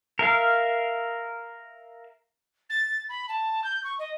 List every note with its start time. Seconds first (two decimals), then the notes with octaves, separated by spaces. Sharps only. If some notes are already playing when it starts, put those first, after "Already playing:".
0.19 A#4 E5 F5
2.69 A6
3.09 B5
3.28 A5
3.64 G6
3.84 C#6
3.99 D#5